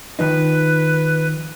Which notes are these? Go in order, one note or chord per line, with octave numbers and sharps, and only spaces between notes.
D#3 F3 D#4 B4